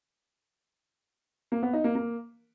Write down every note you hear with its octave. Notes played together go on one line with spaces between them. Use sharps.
A#3
B3
D#4
A#3
A#3